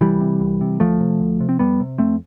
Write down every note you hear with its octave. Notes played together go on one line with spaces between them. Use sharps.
C2 E3 G3
C3
C2
C3
D2 F3 A3
C3
D2
C3
C4
F2 G3 B3
C3
F2 A3 C4